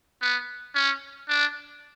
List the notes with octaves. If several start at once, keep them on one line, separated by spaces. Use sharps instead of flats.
B3
C#4
D4